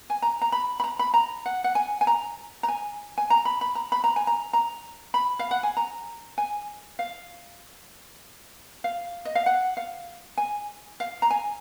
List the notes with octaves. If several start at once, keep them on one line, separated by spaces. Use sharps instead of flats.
G#5
A#5
A#5
B5
B5
A#5
B5
A#5
F#5
F#5
G#5
G#5
A#5
A#5
G#5
G#5
A#5
B5
B5
A#5
B5
A#5
G#5
A#5
A#5
B5
F5
F#5
G#5
A#5
G#5
F5
F5
D#5
F5
F#5
F5
G#5
F5
A#5
G#5